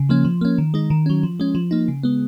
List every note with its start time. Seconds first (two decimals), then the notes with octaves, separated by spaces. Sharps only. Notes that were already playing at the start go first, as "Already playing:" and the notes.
Already playing: C#3
0.09 F3 A#3 C#4
0.25 F3
0.41 A#3 C#4
0.58 D#3
0.74 G#3 D#4
0.90 D#3
1.06 F#3 C#4
1.23 F3
1.40 G#3 C#4
1.55 F3
1.71 A#3 D#4
1.88 C#3
2.03 G#3 B3